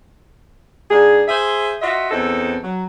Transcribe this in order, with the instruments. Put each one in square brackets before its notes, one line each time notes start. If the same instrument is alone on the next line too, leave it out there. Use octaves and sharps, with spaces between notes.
[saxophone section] G#2 D4 G#4
G#4 C5 E5
F4 F#4 D#5 E5
E2 C4 D#4 A4
F#3